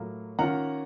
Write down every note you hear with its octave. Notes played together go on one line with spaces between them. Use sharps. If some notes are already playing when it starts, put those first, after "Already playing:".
Already playing: A2 F#3 A#3 F4
D#3 A#3 C#4 F4 F#5 A#5